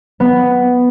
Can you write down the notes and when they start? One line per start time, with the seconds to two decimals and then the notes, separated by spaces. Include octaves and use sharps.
0.20 B3